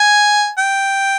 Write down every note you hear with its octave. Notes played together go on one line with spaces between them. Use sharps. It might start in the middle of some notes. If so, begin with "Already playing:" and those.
Already playing: G#5
G5